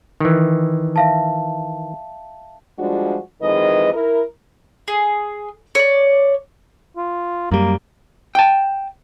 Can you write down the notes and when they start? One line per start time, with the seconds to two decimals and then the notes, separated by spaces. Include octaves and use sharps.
0.20 D#3 E3
0.96 E5 F5 A5
2.79 F3 G3 G#3 D4 F4 F#4
3.42 F2 D#3 E3 G#3 B4 D#5
3.93 E4 A#4
4.88 G#4
5.75 C#5 D5
6.97 F4
7.52 F#2 G3 A#3
8.35 G5 A5